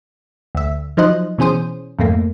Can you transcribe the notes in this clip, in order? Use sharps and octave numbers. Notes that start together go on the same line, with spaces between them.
D2 E5
F3 F#3 D#4 C5 D#5 F#6
B2 E3 C#4 G#4 C5 D#6
F2 G#2 A3 A#3